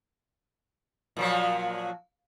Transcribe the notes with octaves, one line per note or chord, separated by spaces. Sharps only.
A#2 F3 F#3